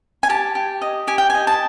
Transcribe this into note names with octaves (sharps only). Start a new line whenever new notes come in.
G#5
G4 A5
G4
D#5
G4 G#5
G5
D#5 G#5
A5